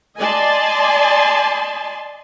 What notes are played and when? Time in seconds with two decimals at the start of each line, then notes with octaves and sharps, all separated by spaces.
0.19 D5 D#5 G#5 A5 C6